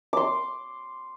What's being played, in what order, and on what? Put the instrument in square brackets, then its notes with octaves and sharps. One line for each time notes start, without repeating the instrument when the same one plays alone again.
[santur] C6 D6